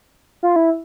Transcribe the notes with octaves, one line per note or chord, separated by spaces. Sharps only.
F4
E4